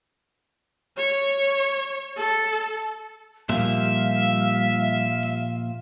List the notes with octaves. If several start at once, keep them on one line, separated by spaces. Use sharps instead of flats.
C#5
A4
A#2 F3 G3 E5 F5